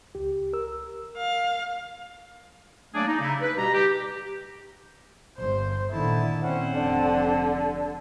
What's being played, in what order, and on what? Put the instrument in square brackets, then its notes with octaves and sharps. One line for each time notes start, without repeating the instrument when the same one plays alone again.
[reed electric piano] C#2 G4
A#4 E6
[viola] F5
[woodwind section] F#3 A3 A#3 D4 G#4 D5
D#4
C#3 D#4 E4
B4
B2 G3 G4 A#5
G4
[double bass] G1 [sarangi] C5
[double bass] A#2 D#3 [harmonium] D3 A5 [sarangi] E4
[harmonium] C4 C5 F#5 [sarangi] C#4
[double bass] F1 [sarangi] D3 [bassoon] D4